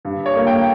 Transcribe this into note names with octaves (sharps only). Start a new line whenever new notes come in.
G2
C#5
A#3
G5